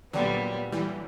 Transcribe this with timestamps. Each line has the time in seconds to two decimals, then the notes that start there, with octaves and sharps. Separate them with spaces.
0.13 A#2 D3 F#3 G3 B3
0.72 E3 G3